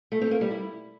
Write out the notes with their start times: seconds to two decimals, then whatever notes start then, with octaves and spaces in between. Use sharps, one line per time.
0.12 A3
0.21 C4
0.31 A#3
0.41 G3
0.51 E4